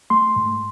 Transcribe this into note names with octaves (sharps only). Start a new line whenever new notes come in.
A3 C6
G#2